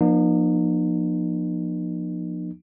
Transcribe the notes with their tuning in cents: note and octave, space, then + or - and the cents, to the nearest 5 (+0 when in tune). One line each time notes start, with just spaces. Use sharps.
F3 +0 A#3 +35 D#4 -40